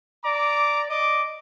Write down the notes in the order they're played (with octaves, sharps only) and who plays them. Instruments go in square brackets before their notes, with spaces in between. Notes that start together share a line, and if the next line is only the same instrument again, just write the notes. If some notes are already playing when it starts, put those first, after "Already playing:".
[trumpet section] D5 A#5 D6
D5 D#5 D6